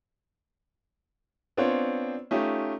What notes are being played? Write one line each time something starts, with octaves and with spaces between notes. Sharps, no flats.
B3 C4 D4 F4 C5 C#5
A3 C#4 D#4 F4 G4